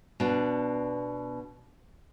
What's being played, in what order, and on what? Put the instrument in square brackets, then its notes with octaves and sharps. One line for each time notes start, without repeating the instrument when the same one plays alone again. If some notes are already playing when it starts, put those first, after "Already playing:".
[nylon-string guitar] B2 D4